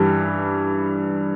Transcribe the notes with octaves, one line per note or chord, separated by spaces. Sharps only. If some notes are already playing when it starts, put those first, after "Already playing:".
Already playing: G2 E3 G3